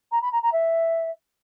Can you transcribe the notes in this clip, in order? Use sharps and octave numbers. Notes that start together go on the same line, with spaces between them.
A#5
B5
A#5
A#5
E5